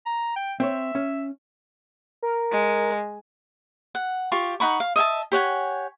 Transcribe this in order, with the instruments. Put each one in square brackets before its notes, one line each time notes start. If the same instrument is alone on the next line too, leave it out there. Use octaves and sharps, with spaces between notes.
[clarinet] A#5
G5
[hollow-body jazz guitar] C4 C5 C#5 [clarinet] E5
[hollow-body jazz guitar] C#4
[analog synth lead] A#4
[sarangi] G#3
[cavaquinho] F#5
F4 G4 C#6
D#4 F#5 B5 C#6
F5
D#5 E5 G#5 A5
G4 C#5 F#5 G#5